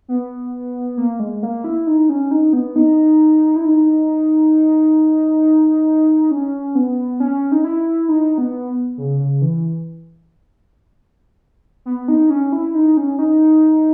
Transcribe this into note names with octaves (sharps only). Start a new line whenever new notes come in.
B3
A#3
G#3
A#3
E4
D#4
C#4
D#4
B3
D#4
E4
D#4
C#4
B3
C#4
D#4
E4
D#4
B3
C#3
C#3
E3
B3
D#4
C#4
E4
D#4
C#4
D#4